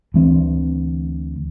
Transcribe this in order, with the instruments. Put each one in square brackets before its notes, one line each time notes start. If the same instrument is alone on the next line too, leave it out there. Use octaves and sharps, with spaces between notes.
[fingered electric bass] D2 E3 B3 C4